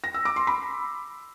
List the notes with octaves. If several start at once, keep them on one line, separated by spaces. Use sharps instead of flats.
A#6
E6
D6
C6
B5